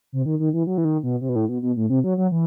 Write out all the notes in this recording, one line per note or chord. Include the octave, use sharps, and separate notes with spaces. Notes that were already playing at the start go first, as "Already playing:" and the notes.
C3
D#3
D#3
E3
F#3
E3
D#3
B2
C3
B2
A2
B2
B2
A2
C3
F#3
F#3
E3